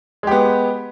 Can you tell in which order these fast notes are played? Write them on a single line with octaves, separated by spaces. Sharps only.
G#3 G4 B3